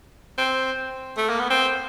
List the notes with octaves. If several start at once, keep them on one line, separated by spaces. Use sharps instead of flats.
C4
A3
A#3
B3
C4